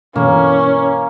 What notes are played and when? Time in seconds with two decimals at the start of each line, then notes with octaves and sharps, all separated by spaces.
0.16 G2 B2 E3 A#3 C#4